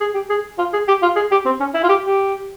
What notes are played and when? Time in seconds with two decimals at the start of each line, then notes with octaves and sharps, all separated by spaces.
0.01 G#4
0.14 G4
0.29 G#4
0.59 F4
0.73 G#4
0.88 G4
1.02 F4
1.16 G#4
1.31 G4
1.45 C4
1.60 C#4
1.74 E4
1.83 F4
1.89 G4
2.04 G4